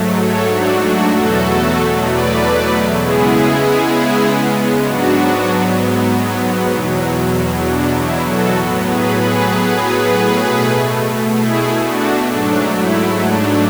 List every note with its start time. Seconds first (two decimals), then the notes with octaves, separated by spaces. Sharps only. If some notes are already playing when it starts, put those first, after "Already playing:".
Already playing: G#2 F#3 A3
0.21 A4 C#5
0.51 D4 F#4
0.83 D4 F#4
1.14 E2 B2 F#3 A3 F#4 A4
2.07 B4 D5
2.99 C#3 G#3 B3 E4 G#4
4.86 G#2 F#3 B3 D4 F#4
6.72 E2 B2 F#3
7.65 D4
7.96 E4
8.27 F#4 A4
8.58 A2 F#3 B3
8.89 G#4 B4
9.21 G#4 B4
10.44 B2 A3
11.38 E4 G#4
11.84 D4 F#4
12.30 G#2 F#3 A3 D4
12.77 E4
13.23 D4